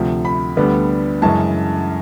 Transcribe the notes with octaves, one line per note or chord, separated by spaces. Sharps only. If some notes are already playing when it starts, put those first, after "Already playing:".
Already playing: D2 C3 F3
B5
D2 D3 G3 B3
F#2 C#3 E3 G#3 C#4 A5